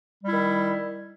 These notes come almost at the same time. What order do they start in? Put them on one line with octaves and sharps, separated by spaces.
G3 E4 D#3